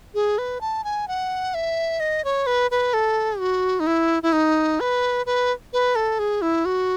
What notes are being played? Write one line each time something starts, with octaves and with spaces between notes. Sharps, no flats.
G#4
B4
A5
G#5
F#5
E5
D#5
C#5
B4
B4
A4
F#4
D#4
E4
E4
D#4
B4
B4
B4
A4
G#4
E4
F#4